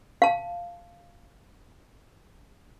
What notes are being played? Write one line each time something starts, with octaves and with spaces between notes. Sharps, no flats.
F5 A5